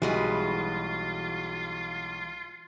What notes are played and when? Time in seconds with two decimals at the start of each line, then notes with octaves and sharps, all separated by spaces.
0.02 B1 E3 G3 G#3 F4 F#4 B4